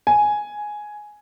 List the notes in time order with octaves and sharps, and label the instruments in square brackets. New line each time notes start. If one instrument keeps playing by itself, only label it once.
[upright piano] G#5